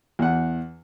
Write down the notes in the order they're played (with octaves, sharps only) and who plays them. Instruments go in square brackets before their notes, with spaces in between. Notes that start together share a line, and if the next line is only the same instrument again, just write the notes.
[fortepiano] E2 F#5